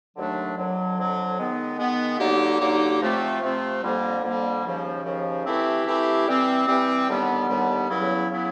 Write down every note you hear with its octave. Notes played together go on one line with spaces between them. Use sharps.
D#2 D3 F#3 A3 D4
F2 D3 F#3
F2 D3 F#3
D#3 G#3 B3
D#3 G#3 B3
D3 F#3 A#3 D#4 G4
D3 F#3 A#3 D#4 G4
C3 F3 A3 C4 F4
C3 F3 A3 C4 F4
F2 D3 G3 A#3
F2 D3 G3 A#3
D#2 C#3 F3
D#2 C#3 F3
E3 A3 C4 E4 G4
E3 A3 C4 E4 G4
E3 G3 C4
E3 G3 C4
D#2 D3 G3 B3
D#2 D3 G3 B3
E2 C#3 F#3 B3 E4
C#3 F#3 B3 E4